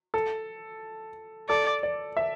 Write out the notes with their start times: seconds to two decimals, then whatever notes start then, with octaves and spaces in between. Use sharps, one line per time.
0.14 A4
1.49 A4 D5
1.83 D5
2.17 E5